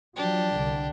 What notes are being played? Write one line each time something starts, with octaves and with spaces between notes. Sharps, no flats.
F3 F#3 D4 G4
C2 D3